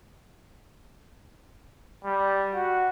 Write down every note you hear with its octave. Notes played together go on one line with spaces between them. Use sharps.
G3
F#4